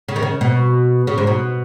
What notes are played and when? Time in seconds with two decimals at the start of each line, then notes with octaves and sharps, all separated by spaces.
0.08 C#3
0.16 D#3
0.22 C#3
0.41 B2
1.07 C#3
1.18 G#2
1.27 B2